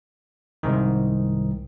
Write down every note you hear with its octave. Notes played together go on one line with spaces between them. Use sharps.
C2 G#2 D#3